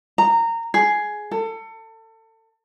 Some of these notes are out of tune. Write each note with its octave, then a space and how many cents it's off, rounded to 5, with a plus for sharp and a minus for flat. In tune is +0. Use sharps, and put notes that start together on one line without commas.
A#5 -20
G#4 +10
A4 +30